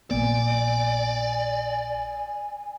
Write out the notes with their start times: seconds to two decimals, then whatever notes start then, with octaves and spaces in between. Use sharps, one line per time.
0.11 A#1 A#3 B3 D5 G#5